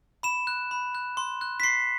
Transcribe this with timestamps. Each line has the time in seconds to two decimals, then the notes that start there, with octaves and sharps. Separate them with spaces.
0.23 B5 E7
0.47 F#6
0.71 B5
0.95 F#6
1.17 C6
1.41 F#6
1.60 B6
1.63 C6 C7